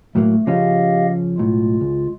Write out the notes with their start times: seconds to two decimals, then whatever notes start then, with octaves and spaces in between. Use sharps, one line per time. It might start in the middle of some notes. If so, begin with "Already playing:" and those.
0.16 A2 F#3 A3 A#3
0.47 C#3 F3 C#4 G4 D#5 F5
1.38 B1 A2 G#3 F4
1.81 C#2